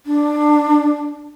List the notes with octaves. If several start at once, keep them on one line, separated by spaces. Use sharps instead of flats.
D4